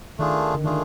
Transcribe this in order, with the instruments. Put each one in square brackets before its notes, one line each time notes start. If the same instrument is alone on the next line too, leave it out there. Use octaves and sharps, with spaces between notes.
[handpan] D#3 [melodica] A3 D4 F4 G#4
[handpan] D3
[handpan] D#3 [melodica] A3 D4 F4 G#4